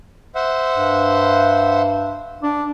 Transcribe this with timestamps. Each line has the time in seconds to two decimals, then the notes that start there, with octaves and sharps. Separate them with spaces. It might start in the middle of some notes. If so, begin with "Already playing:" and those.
0.35 C5 E5 F#5
0.77 G2
2.43 D4